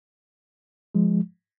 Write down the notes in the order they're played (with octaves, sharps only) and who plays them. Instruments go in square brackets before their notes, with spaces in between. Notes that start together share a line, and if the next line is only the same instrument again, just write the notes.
[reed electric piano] F3 G#3